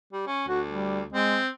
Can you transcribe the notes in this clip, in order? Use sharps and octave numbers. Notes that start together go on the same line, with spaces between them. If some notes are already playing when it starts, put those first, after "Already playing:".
G3
C#4
D2 F#4
G3
G#3 C4